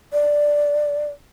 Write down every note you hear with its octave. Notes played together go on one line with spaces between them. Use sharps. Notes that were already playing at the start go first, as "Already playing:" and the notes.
D5